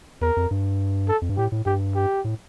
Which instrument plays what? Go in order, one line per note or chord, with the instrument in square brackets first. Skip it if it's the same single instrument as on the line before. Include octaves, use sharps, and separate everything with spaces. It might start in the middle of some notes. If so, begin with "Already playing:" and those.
[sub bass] E2 [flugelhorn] A#4
[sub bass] F2
G2
[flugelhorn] A4
[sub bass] F2
G2
[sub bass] A2 [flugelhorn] G4
[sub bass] A2
[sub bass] G2 [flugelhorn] G4
[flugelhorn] G4
[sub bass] A2